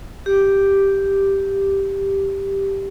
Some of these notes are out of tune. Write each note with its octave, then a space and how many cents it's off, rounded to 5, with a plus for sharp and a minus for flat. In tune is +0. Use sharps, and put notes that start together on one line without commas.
G4 +0